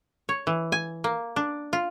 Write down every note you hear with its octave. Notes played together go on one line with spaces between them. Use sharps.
C#5
E3
G#5
A#3
D4
F4